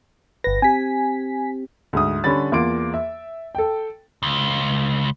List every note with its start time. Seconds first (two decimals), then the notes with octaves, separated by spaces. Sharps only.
0.44 G1 B4 A#6
0.62 C4 G4 G#5 B6
1.93 D2 G#2 D#6
2.24 D3 G3 C#4 B5 A6
2.52 E2 A#3 F4 C6 D6 D7
2.94 E5
3.55 A4 G5
4.23 C#2